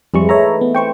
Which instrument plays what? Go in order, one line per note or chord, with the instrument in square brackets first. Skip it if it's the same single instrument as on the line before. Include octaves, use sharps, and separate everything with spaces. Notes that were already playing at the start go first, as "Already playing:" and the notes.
[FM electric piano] F2 G3 C#6 [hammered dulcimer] G#2 E3
[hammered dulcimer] A3 [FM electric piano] C#5 E5 A#5
[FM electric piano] B3
[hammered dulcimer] C4 C5 [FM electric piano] G5 C#6